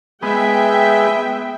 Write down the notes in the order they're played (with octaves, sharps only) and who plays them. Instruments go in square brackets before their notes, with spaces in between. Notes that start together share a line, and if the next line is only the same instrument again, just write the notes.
[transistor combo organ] G#3 B3 [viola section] E5 G5